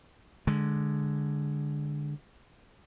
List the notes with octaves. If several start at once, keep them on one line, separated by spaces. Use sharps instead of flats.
D3 G#3